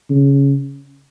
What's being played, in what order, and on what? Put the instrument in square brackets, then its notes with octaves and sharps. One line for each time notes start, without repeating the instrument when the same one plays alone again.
[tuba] C#3